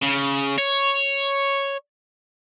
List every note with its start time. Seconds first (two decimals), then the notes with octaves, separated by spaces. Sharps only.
0.02 C#3
0.58 C#5